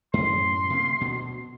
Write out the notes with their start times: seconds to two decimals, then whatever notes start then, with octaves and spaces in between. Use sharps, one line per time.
0.13 F#2 A2 C6
0.70 C3 A#3
1.01 D2 B2